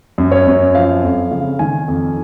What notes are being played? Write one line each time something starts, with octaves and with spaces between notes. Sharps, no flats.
F#2
C#5
F#2
F3 F5
F2
C#3
D#3 G#5
F2